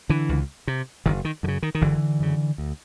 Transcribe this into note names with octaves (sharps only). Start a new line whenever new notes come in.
D3 E3
C#2
C3
F#1 D#3
D#3
F#2 C#3 D3
D#3
D#3
F#1 D3 E3
F#2 C#3
D2